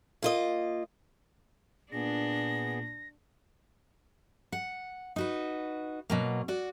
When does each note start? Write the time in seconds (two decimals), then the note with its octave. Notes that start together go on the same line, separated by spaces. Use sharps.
0.22 A#3 F4 D#5
1.92 A#2 B3 D4 G#4 A#6
4.52 F#5
5.16 D#4 F#4 B4
6.10 B2 F#3 A#3
6.48 F#4 D5